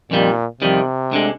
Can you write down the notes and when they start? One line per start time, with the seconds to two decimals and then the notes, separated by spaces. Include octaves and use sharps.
0.11 F2 A#2 D#3 G3
0.61 F2 C3 D#3 G3
1.11 D2 D3 G#3